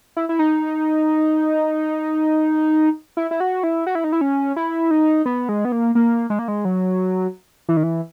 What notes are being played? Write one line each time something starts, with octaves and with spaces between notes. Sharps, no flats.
E4
E4
D#4
E4
E4
F#4
E4
F#4
E4
D#4
E4
C#4
E4
D#4
B3
G#3
B3
A#3
A#3
G#3
A#3
G#3
F#3
E3
D#3
E3